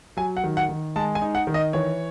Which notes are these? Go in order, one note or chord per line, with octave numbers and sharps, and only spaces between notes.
F#3 G#5
F#5
D#3
F#5
D#3
G#3 A5
G#5
D#4
F#5
D#3
D#5
E3 C#5